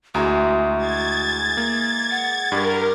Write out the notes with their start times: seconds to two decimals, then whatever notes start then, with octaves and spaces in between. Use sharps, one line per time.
0.15 D2 E3 G#3 F#4 G#4 A#5
0.77 G#6 A6
1.57 A#3
2.11 F#5
2.52 G2 G3 A#4